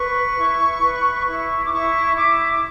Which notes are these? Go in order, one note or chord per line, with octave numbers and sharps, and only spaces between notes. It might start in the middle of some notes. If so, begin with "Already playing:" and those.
Already playing: B4 C#6
E4
B4
E4 C#6
D6
E4 C#6
E4 D6